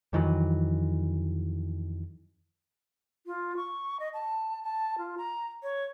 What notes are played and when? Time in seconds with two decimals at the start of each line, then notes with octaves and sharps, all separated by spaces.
0.13 F2 D#3 E3 F#3
3.26 F4
3.57 C#6
4.00 D#5
4.14 A5
4.63 A5
4.98 F4
5.18 A#5
5.63 C#5